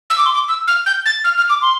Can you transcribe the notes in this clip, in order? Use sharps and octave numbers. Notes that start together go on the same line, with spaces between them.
E6
D6
C6
D6
E6
F6
G6
A6
F6
F6
D6
C6